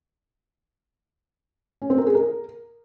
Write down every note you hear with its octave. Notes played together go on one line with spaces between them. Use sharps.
C#4
C4
A#4
G#4
A#4